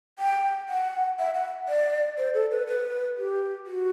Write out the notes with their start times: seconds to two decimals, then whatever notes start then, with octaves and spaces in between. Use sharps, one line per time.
0.19 G5
0.69 F#5
1.19 E5
1.34 F#5
1.68 D5
2.18 C5
2.34 A4
2.51 B4
2.67 B4
3.17 G4
3.67 F#4